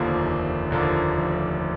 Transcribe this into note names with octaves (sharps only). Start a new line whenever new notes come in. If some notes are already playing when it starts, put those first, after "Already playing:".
Already playing: F1 D#2 D3 F3 A#3
F1
D#2 D3 F3 A#3
F1